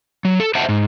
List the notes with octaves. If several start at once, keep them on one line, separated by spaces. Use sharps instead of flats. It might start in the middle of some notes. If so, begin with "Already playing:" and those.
F#3
A4
C5 D#5 E5 F#5 G5 A5
G#2